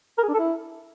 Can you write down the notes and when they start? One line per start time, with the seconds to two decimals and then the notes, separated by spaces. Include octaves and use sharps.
0.18 A#4
0.23 G#4
0.28 D4
0.34 A4
0.39 E4